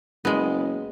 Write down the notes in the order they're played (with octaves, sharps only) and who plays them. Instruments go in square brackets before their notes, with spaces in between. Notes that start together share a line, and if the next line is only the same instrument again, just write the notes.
[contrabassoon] F#1 [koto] G#3 B3